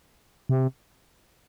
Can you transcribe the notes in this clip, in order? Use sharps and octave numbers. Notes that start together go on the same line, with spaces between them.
C3